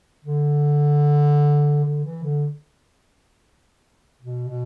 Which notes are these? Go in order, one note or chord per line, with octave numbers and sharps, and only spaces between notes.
D3
D3
E3
D3
B2
B2